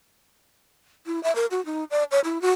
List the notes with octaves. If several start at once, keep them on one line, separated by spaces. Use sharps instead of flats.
E4
E5
A#4
F#4
D#4
D5
C#5
E4
F#4